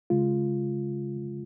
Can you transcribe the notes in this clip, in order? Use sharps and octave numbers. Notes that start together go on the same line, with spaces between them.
C#3 G#3 F4